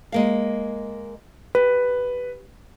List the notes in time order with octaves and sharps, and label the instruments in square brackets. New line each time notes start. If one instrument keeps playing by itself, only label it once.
[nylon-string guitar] G#3 A#3 F5
[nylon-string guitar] G4 [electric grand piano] B4